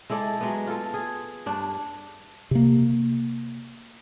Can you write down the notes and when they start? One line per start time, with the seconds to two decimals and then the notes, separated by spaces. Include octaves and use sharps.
0.10 G#3 E4 A4 D5
0.41 F#3 G#3 B3
0.67 F4 A4
0.94 G#4
1.46 G2 D4
2.51 C3 A#3